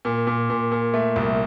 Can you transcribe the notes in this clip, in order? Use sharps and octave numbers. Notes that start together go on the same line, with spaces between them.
A#2
A#2
A#2
A#2
A3
C2